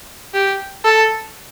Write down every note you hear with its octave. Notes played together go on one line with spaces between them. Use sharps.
G4
A4